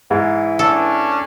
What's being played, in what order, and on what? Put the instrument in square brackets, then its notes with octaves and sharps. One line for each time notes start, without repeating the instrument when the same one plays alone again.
[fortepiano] G#2 [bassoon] E3
[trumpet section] C#4 D4 [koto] A4